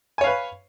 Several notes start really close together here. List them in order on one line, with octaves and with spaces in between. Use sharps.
G#5 C#5 F5 B4